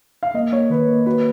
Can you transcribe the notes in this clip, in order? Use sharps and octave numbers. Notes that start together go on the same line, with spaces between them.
F5
A#3 D#5
A#3 C#5
D#3 B4
A#3
F#4 B4